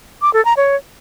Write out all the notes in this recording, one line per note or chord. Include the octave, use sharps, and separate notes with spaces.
D6
A4
A#5
C#5